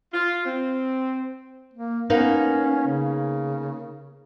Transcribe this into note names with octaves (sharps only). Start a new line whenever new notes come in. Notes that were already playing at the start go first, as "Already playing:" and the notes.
F4
C4
A#3
A#3 B3 C#4 D#4
C#3